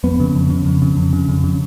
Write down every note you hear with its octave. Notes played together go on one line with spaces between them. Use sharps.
F2 B3
C#3
F2
C#3
F2
C#3
F2
C#3
F2
C#3